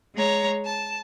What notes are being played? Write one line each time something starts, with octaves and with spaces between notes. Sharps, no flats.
G#3 C#5 A#5
A5